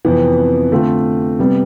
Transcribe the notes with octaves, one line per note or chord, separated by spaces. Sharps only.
F2 C3 E3 B3
D3 A3 C4 F4 A4
C3 G3 B3